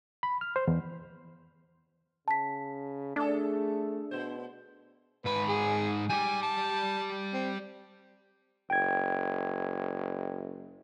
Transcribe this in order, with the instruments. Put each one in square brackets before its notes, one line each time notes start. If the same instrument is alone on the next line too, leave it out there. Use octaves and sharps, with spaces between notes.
[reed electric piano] B5
F6
C5
E2
[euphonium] C#3 [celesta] A5 B6
[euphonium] A3 [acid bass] D4 [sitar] G#4 A4
[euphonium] B2 [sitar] B3 C5
[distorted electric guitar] G#2 B5 [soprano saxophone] B4
[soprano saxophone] G#4
[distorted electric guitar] G3 G4 [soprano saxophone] G#5
[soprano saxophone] A5
C4
[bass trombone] F#1 [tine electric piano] G5 G#6